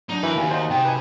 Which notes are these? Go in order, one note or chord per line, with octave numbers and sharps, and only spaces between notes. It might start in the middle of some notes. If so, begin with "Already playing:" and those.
F#3 D4 D#4
E3 F#4 A#4 B4
D#2 F5 G#5
D#4 F#4 C5 D5 E5 F5
C3 D5 G5
B4 G#5